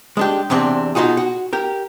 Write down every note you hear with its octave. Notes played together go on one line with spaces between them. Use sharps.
G#3 D4 G4
E2 C3 C4 D4
B2 D#4 F4 F#4 G#4
F#4
G4 A#4